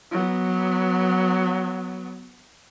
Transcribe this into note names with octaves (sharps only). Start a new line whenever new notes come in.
F#3 B3